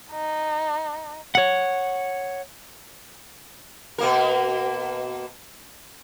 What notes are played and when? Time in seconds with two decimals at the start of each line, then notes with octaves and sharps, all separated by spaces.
0.11 D#4
1.35 C#5 F#5
3.98 B2 A#3 A#4